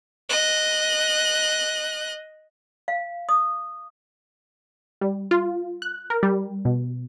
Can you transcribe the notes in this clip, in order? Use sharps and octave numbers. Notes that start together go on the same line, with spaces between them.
D#5 F#6
F5
D#6
G3
F4
F#6
A#4
G3
B2